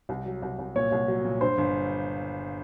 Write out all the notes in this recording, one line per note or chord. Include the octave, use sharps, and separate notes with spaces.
C2
F#3
C2
C2
A#2 C#5
C2
F#3
A#2
G2 C5
G1